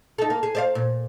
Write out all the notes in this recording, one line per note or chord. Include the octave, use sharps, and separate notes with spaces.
D#4 A4
A#3
G#4
C5 D5 F5
A#2